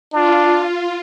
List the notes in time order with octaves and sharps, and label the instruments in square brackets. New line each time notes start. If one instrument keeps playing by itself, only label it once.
[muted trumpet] D4 [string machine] F4